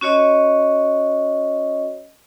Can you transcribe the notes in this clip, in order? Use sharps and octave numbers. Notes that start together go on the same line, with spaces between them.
C#4 F#4 C#5 D#5